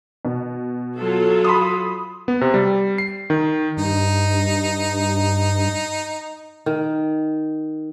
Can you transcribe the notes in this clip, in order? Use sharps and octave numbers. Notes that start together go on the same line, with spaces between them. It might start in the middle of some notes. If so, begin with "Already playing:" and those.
B2
F#3 F4 A4
B5 C6 D#6
B3
C3
G3
C7
D#3
G2 D#4
D#3